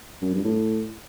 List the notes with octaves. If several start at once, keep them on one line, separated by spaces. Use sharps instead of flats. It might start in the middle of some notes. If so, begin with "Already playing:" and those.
F#2
G2
A2